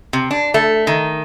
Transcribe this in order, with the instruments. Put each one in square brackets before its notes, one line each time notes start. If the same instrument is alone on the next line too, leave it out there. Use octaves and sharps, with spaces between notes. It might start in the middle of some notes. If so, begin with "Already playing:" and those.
[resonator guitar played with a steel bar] C3
D4
A3
D#3